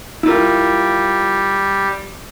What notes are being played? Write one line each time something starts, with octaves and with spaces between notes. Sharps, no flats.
G3 E4 F4 A#4